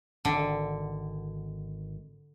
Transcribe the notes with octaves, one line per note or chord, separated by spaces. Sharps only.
G#1 D3